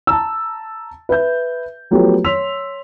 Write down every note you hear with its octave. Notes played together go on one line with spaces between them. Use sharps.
A5 A#5 E6
B4 E5 G6
F3 F#3 A3 B3 G4 A4
C#5 C6 E6 B6 F7